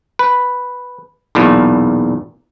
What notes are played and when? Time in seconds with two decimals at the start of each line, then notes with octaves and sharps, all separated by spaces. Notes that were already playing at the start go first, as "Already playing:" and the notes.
0.19 B4
1.35 B1 E2 A#2